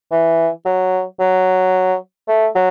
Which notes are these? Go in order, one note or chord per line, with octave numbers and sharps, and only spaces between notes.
E3
F#3
F#3
A3
F#3